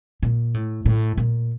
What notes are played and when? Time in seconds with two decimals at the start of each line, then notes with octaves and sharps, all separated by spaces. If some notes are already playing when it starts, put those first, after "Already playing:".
0.23 A#2
0.54 A2
0.86 A2
1.17 A#2